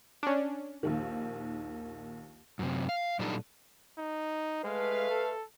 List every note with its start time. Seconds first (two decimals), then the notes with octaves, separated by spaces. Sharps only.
0.23 C#4 D4
0.83 A#1 D#2 D#3
2.59 F#2 C3
2.89 F5
3.19 A#2 F#3 G3 D4 D#4 A4
3.98 D#4
4.64 G#3 A3 B4 F5
5.10 A4